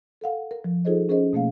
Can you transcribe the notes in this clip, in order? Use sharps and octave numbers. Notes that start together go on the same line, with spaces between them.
A4 A#4 F5 F#5
A#4
F3
D#4 F4 G#4 A4 C5 D#5
C#4 G#4 A#4 C5 D#5
B2 A3 A#3 F5